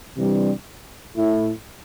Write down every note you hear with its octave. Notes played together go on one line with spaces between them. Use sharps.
C3 E3 G3 D4
A2 A3 E4